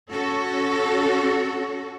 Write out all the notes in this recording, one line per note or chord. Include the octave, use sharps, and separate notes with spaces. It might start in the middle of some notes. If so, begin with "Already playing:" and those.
C#4 F#4 A4